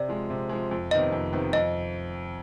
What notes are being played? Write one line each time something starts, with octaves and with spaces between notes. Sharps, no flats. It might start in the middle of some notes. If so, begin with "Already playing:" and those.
Already playing: C3 D5
F3 G#3
C3
F3 G#3
F2
C3 D#3 B3 D#5
F2
C3 D#3 B3
F2 D#5